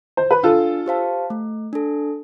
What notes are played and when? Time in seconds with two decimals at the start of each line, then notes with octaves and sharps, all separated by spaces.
0.17 C5
0.31 B4
0.43 D4 F4 A4
0.86 G4 C5 F5 A5
1.30 A3
1.73 D4 A4